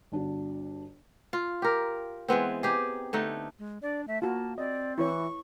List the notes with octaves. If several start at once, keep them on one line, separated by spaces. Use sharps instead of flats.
G1 D4 F#4
F4
G4 A#4
E3 G#3 B3 C4
D#4 G4 G#4
D3 A3 D#4
G#3
D4 D5
A3 E5
A#3 F4 F#4 A5
C4 D5 D#5
E3 E4 B4 C#5 C#6